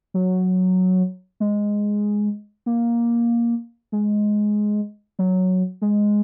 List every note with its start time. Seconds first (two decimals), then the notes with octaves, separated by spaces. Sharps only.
0.14 F#3
1.40 G#3
2.66 A#3
3.92 G#3
5.19 F#3
5.82 G#3